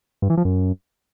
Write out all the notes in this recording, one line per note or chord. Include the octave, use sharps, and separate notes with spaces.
G2
E3
F3
F#2